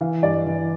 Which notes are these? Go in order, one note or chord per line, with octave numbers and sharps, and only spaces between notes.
E3 F5
G2 D5
E3